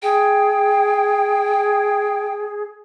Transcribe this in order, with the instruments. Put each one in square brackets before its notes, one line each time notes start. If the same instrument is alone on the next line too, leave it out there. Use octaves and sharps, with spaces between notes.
[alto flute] G#4 [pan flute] G5